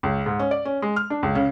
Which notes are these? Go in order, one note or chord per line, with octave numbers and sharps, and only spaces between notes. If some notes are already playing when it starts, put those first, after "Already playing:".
C#2
G#2
C#4
D5
C#4
G#3
F6
D4
C#2
C#3